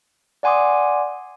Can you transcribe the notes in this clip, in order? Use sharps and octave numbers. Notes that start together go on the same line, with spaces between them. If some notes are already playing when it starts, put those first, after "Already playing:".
D5 F#5 G#5 C6 D6 D#6